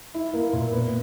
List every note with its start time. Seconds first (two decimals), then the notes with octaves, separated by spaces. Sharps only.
0.14 E4
0.33 A#3
0.53 A#2
0.72 B3